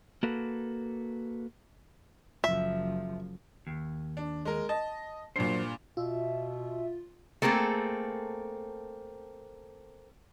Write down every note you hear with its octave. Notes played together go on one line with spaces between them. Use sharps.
A#3 F#4 A4 B4
F#1 F3 E5
D#2
D4
G#3 A#4
D#5 A5
G2 A#2 F#3 C5
B2 F4 E5
A3 A#3 C4 G#4 A4